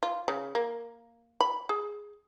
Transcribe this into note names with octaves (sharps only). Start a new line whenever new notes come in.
F4
C#3
A#3
B5
G#4